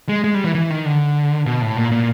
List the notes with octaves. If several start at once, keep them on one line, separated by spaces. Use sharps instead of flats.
G#3
G#3
G3
E3
E3
D#3
D3
B2
A2
A#2
A#2